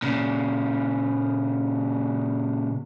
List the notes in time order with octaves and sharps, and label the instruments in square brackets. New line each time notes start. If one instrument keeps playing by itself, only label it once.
[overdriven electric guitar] A#2 C#3